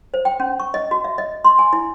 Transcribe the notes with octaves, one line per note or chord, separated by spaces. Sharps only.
C5
G5
C#4
C#6
D#5
F#4
E5
D#5
C6
G#5
E4